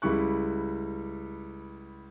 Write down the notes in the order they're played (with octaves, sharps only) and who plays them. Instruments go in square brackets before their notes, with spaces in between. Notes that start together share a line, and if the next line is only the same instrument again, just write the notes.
[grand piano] C#2 G3 E4 C#6 F#6